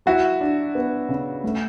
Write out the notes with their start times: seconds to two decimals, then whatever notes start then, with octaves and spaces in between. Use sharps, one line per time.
0.06 F#3 E4 F#4
0.41 D4
0.75 B3
1.09 C#3
1.44 A3